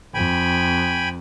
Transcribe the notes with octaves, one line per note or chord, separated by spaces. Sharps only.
F2 G5 G#5 B5